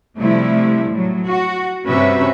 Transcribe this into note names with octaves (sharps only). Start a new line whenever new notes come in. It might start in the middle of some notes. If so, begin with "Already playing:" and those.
C3 F3 G3 A3 E4
A2 F#3
F#4
G2 C3 C#4 F#4 B4 E5